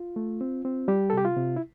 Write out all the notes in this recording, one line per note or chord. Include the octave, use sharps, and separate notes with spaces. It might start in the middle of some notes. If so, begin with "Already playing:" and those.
Already playing: F4
A3
C4
C4
G3 G4
A4
C3 G4
F4
C3
E4